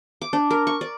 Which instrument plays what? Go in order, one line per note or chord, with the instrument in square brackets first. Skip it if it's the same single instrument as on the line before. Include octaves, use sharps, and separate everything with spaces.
[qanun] D6
D4
A#4
C#6
D5